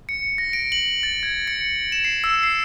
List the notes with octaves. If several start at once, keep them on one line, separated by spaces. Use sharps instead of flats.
C#7
A#6
D7
F#7
A6
G#6
C#7
E7
C7
E6
C7